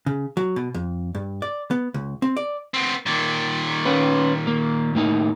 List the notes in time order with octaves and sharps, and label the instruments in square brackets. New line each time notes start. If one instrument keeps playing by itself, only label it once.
[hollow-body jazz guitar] C#3
F#3
B2
F2
G2
D5
B3
C#2
C4
D5
[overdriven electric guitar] B3 C4
A#2 D#3
[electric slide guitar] C#4 B4
A#3
A2 A#3 D#4